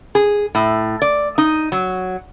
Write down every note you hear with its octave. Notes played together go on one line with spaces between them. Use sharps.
G#4
A2
D5
D#4
F#3